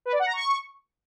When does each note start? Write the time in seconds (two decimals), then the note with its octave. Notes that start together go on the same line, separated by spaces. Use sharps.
0.05 B4
0.12 D5
0.19 F#5
0.26 A#5
0.33 C#6